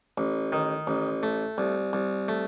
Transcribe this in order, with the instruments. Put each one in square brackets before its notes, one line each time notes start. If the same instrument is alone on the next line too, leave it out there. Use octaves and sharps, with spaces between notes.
[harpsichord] A1
D#3
A1
A3
C2
C2
A3